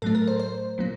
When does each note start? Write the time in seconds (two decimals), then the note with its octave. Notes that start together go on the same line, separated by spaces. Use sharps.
0.02 A2 F#3 A3 A4
0.15 A#4
0.28 C5
0.40 C5
0.78 A#2 F#3 A#3